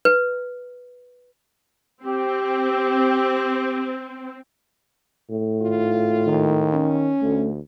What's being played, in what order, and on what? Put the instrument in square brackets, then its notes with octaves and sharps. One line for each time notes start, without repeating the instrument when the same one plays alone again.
[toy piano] B4
[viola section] C4 [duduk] G4
[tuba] A2
[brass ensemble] G#1 F4
[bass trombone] D#3
[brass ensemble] C#4
[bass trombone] D2 [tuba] A3